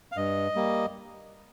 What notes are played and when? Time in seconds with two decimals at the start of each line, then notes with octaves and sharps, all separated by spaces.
0.12 F5
0.17 G2 D#5
0.55 G3 A#3